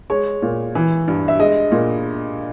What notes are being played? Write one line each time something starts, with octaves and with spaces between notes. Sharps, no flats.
G#3 C#5
A#2
E3
G2
E5
G#3 D#5
A#2